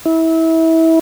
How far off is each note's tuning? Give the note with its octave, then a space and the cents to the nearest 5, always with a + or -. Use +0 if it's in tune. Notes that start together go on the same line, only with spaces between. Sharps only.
E4 -25